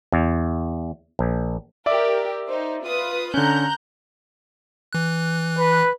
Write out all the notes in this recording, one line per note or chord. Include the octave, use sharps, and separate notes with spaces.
E2
A#1
G4 A#4 D5 E5 D6
D#4 C5
F4 B4 D#6
D3 C#4 A#5 F#6 G6
E3 F#6
B4